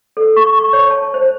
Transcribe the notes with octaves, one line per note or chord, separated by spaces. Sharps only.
A4
C#6
C#6
C#5
A5
C5